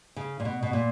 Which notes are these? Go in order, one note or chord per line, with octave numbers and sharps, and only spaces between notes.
C#3
A#2
B2
B2
A#2